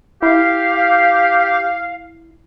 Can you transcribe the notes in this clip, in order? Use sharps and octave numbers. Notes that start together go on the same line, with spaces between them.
E4 G4 F5